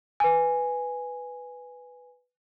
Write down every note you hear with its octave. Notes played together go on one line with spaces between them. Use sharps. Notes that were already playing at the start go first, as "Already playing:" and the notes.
B4 G#5